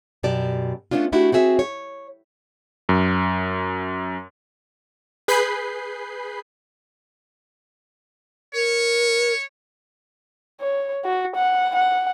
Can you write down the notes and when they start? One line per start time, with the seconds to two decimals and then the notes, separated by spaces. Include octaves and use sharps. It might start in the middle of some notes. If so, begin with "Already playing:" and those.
0.23 F#2 B2 G4 D5 A5
0.91 A3 B3 C#4 D4 F4
1.12 A3 D4 E4 F#4 G4
1.32 C4 F#4 G#4 E5
1.59 C#5
2.89 F#2
5.28 G#4 B4 B5 G6 C7
8.55 A#4 C#5
10.61 C#5
11.05 F#4
11.36 F#5
11.76 F#5